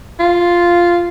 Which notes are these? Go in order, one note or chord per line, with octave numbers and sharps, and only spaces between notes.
F4